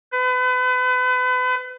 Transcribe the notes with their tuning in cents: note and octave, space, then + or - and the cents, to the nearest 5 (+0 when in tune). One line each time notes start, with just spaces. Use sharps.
B4 +35